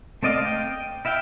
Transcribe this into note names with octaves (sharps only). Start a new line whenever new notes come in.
A3 C4 D5 D#5 F5
G5
E4 E5 F5 G5